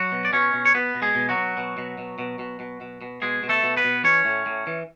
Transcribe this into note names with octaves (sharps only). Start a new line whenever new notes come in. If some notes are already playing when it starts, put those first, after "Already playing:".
Already playing: F#3 F#4
B2
D5
B2 C#4 C#5
B2
C#5
B2 B3 B4
B2
G#3 G#4
B2
F#3 F#4
B2
B2
B2
B2
B2
B2
B2
B2
B2
B2 G#3 G#4
B2
A3 A4
B2
B3 B4
B2
E3 C#4 C#5
A2
A2
E3